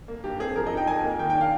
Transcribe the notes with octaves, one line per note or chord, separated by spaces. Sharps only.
A#3
G2 G4
C4 G#4
F3 A#4
D#5
D#4
G5
F2 G#5
A#3
D#3 G5
G5
D4
F5